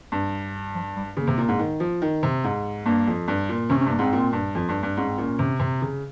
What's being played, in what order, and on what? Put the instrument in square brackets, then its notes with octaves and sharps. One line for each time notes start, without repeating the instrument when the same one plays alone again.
[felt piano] G2
[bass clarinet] F3
G3
[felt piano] C#3 [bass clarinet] A#3
[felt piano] C3
A#2
G#2
D#3
F3
D#3
C3
G#2
[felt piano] G2 [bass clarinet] A#3
[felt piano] F2
G2
A#2
[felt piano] C3 [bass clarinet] C#4
[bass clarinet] C#4
[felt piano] G2 [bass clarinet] A#3
[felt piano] G#2 [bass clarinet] C4
[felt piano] A#2
G2
F2
G2
G2
[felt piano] G#2 [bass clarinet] C#4
[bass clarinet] C4
[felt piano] A#2 [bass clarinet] C#4
[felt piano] C3
C3
C#3